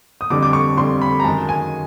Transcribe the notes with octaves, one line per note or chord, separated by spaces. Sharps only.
D#6
F2 D3 G3 D6
D6
C#6
F2 D3 G3 C6
B5
A#5
F#2 D#3 G#3 A5
G#5